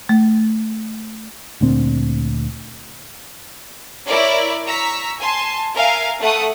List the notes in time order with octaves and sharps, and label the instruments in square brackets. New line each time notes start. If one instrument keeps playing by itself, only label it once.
[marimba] A3
[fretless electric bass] D2 A#2 C4
[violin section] E4 A#4 C#5 D5
A#5 C#6 E6 B6
G#5 A5 C6
A#4 E5 F5 G#5
A3 F#5 D#6